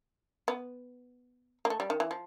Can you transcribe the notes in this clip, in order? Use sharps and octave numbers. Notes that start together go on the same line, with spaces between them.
B3
A#3
A3
G3
D#3
E3
F3